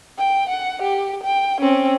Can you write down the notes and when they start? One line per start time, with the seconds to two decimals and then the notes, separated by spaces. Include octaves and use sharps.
0.18 G5
0.49 F#5
0.82 G4
1.23 G5
1.61 C4 C#4